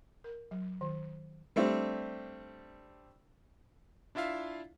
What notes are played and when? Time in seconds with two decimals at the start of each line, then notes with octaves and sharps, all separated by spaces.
0.24 A#4
0.51 F#3
0.81 D#3
1.56 G3 A3 C4 D4
4.15 D4 E4 F4 E5 F5